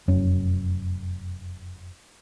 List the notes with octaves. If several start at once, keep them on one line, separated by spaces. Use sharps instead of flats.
F1 F#2 C#4